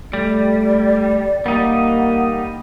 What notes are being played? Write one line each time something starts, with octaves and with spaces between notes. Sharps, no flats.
G3 A3 D5
G3 A#3 D#4 F#5